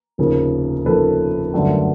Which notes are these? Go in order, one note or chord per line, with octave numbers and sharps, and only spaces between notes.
F1 D#2 C#3 F3 A#3
F1 D#2 C#3 F3 A#3 A4 B4
G1 F#2 D3 F#3 A3